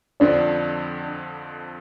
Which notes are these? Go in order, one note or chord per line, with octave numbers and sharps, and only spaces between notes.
F2 D3 F3 C4 D4